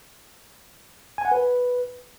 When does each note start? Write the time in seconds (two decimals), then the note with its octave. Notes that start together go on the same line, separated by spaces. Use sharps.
1.18 G#5
1.25 F#5
1.32 B4